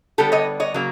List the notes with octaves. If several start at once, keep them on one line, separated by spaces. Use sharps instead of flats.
D3 G3 B3 G4 A4
C#5 D#5
C#5 D#5
C#3 F#3 A#3